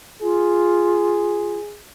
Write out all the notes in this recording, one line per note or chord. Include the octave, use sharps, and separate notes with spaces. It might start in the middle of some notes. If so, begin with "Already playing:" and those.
F4 G#4